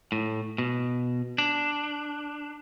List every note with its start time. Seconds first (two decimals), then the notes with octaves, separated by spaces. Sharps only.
0.12 A2
0.58 B2
1.38 D4